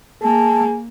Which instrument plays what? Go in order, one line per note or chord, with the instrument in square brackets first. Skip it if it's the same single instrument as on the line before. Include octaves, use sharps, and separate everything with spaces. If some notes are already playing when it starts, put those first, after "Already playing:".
[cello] A#3 [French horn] G#4 [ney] A5